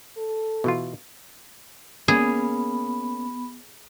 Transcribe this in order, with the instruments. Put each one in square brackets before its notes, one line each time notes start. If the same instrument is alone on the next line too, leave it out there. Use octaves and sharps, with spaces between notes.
[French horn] A4
[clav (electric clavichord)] B2 E3 F4
[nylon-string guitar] A#3 C#4 [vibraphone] B3 B5 [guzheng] G#4